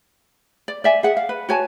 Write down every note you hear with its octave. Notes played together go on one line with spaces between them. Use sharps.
D5
D5 E5 G#5
G#4 F#5
F5
B4
F#4 C#5 G#5 A5